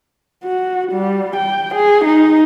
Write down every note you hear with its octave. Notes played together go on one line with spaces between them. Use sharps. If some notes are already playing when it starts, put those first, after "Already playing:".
F#4
G3
G5
G#4
D#4